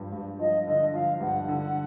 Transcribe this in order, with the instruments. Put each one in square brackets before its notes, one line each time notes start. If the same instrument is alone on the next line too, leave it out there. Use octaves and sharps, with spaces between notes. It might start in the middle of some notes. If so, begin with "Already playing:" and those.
Already playing: [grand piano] G2 F3
G2
[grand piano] F3 [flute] D#5
[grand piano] D3 [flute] D#5
[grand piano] F3 [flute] F5
[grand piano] G2 [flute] F#5
[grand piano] D3